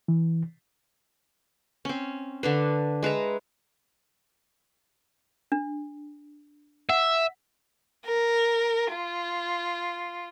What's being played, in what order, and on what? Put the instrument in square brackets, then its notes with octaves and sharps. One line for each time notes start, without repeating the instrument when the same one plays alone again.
[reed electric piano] E3
[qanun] C4 C#4
D3 D4 B4
G#3 B4 E5 A#5
[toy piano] D4
[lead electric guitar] E5 [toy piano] F#5
[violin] A#4
F4